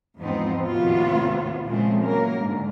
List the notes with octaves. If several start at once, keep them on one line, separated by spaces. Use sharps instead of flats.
E2 G#2 F3 B3 C4 D#4
D#2 A2 C3 B3 F4 F#4
A#2 C#3 F3 G#3 A3 C4
E3 F#3 A#3 A#4
G#2 D3